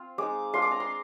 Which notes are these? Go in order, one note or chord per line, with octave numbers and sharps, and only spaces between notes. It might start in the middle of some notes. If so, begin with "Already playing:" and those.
Already playing: C4 F4
G#3 D#4 D6
G#3 D4 F4 C6
D6
A#5
C6